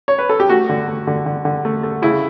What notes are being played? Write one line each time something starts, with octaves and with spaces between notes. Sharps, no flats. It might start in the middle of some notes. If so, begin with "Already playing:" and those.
C#5
B4
A4
G4
A3 F#4
D3
A3
D3
D3
D3
A3
A3
C#3 E4